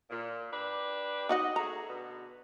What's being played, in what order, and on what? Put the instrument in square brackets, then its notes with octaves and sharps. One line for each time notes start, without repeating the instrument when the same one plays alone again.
[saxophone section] A#2
D4 G4 B4
[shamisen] D#4 F#4 F#5 [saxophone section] D#5
[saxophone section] A3 F#4 G#4 [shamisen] A#5
[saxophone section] B2 D3 B3